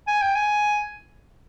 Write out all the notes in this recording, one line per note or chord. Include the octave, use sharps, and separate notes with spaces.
G#5
G5
G#5